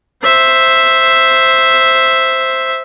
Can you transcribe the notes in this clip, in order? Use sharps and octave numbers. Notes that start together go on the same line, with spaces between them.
C5 E5